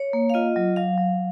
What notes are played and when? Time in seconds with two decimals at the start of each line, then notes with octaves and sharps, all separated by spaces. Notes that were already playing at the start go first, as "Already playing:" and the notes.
Already playing: C#5
0.13 A#3
0.30 F5
0.34 F4 D#5
0.56 F#3
0.76 F#3 F5
0.98 F#3